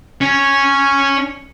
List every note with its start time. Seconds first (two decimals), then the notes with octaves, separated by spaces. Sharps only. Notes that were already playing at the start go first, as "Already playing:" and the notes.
0.21 C#4